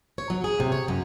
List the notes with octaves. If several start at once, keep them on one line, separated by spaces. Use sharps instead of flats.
C#5
F#3
G#4
C3
C#5
F#2